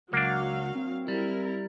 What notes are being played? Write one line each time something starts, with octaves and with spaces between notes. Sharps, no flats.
C#2 F#3 A#3 D4 F5 F#5
C4
G3 E4 A#4